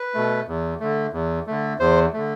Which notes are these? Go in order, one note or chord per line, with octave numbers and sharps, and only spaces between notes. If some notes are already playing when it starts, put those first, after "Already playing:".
Already playing: B4
B2 A3
E2
D3 A3
E2
D3 A3
E2 C5
D3 A3